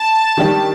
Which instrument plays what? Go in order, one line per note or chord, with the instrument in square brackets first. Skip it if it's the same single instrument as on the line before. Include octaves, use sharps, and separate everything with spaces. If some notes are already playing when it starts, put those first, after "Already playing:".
Already playing: [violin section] A5
[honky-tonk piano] D#3 G3 D4 G4 D5